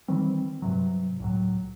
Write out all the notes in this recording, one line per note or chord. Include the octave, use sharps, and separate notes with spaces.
D#3 E3 G3 C4
G2 C3 F#3
C#2 A2 F#3